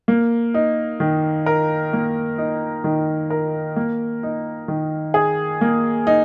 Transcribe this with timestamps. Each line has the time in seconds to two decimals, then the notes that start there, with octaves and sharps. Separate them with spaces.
0.08 A#3
0.54 D#4
1.00 D#3
1.46 A#4
1.93 A#3
2.38 D#4
2.84 D#3
3.30 A#4
3.76 A#3
4.23 D#4
4.68 D#3
5.14 G#4
5.61 A#3
6.07 D#4